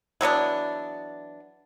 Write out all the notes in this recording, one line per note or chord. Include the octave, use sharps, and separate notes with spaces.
E3 F#3 B3 D4